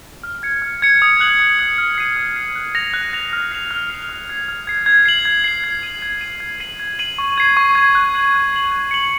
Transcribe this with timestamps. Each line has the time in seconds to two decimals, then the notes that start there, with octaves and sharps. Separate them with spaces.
0.23 F6
0.43 G#6 C#7
0.62 F6
0.82 G#6 C#7
1.02 D#6
1.20 F#6 C7 F#7
1.40 D#6
1.59 F#6 C7 F#7
1.78 F6
1.98 C7 D#7
2.16 F6
2.36 C7 D#7
2.56 F#6
2.75 A#6 F7
2.94 F#6
3.13 A#6 F7
3.33 F6
3.52 C7 F7
3.71 F6
3.90 C7 F7
4.09 F6
4.29 G#6 C7
4.48 F6
4.67 G#6 C7
4.86 G#6
5.05 C7 F#7
5.25 G#6
5.44 C7 F#7
5.64 G#6
5.83 D#7 F#7
6.02 G#6
6.21 D#7 F#7
6.40 G#6
6.60 C7 D#7 F#7
6.80 G#6
6.99 C7 D#7 F#7
7.18 C#6
7.38 G#6 C7
7.57 C#6
7.75 G#6 C7
7.95 F#6
8.15 C7 F#7
8.34 F#6
8.53 C7 F#7
8.72 G#6
8.91 C#7 F#7